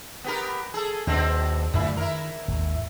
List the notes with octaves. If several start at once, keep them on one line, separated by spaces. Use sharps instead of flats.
B3 G4 A#4
G#4 A4
D#2 B2 C4 D4
F#2 A#2 D3 A3 E4
D#3 E4 A#4
G#1 D#2